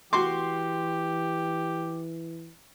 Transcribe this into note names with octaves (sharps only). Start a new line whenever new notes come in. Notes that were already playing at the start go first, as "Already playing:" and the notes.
E3 F#4 G4 C6 D6